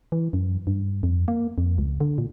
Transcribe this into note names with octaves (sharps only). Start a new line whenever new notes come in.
E3
F#2
G2
F2
A#3
F2
C#2
D3
A#2